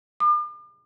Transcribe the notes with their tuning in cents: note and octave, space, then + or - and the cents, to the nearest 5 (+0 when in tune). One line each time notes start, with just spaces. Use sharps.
D6 +45